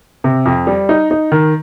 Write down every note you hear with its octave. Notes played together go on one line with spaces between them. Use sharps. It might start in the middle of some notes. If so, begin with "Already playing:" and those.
C3
F2
G3
D#4
D#4
D#3